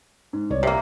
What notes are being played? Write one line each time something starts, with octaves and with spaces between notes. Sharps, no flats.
G#2
C2 C#5 D5
C3 A#3 G4 E5